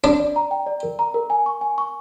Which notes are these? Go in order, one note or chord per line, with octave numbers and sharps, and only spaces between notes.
D4 D5
D5
A#5
G5
D5
A#4
A#5
A#4
G#5
C#6
G#5
C#6